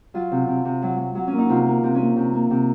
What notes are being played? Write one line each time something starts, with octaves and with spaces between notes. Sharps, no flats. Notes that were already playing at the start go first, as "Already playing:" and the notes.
F#3 F4
C3
C3
C3
F#3
F#3
F#3
C#4
A#3
D#4
C3 F4
A#3
C3 C4
C#4
A#3
C3
A#3
C3